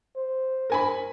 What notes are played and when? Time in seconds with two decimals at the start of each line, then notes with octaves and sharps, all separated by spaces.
0.16 C5
0.70 A#4 G#5 B5